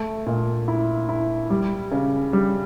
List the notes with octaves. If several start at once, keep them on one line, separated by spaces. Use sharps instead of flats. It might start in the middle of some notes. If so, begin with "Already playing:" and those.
Already playing: A3
A#2
E4
E4
G3
C#3
G3